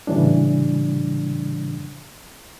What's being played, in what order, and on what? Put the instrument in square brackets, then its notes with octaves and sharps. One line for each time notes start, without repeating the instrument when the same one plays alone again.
[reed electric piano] A2 C#3 E3 G3 D4